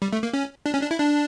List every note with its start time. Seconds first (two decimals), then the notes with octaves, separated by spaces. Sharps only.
0.02 G3
0.13 A3
0.23 A#3
0.33 C#4
0.66 D4
0.73 C#4
0.82 D4
0.91 E4
0.99 D4